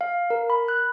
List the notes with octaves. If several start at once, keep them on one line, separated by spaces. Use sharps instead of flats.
F5
A#4
B5
F#6